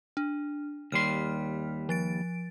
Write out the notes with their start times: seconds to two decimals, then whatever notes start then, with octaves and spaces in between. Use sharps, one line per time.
0.17 D4
0.92 D#2 G3 C6 F6 B6
1.89 F3 A6 D7